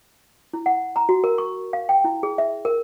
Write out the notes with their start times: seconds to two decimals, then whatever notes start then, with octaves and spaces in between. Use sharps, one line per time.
0.54 E4
0.66 F#5
0.96 A#5
1.09 F#4
1.24 A#4
1.38 C#6
1.73 F5
1.89 G5
2.04 E4
2.23 G#4
2.38 E5
2.65 A#4